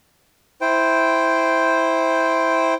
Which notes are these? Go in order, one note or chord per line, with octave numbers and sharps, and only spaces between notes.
E4 C5 G5